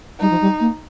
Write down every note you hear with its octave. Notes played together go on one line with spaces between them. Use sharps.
G3 D#4
F3
G3
A#3